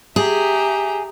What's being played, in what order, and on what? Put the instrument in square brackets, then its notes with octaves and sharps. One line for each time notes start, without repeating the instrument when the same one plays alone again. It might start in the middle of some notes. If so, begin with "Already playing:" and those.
[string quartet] G4 E5 A#5 [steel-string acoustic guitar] G#4